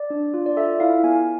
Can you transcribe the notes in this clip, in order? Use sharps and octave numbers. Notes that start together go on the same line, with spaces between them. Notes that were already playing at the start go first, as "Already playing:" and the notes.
Already playing: D5
D4
F4
D5
A4 E5
E4 F5
B3 G#5